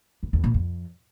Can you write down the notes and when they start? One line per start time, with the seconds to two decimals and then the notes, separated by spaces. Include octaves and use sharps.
0.23 F2
0.33 E2
0.44 A#2
0.54 F2